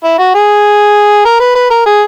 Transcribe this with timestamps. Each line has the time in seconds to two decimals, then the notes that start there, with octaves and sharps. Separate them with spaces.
0.04 E4
0.19 F#4
0.35 G#4
1.25 A#4
1.40 B4
1.55 B4
1.70 A#4
1.86 G#4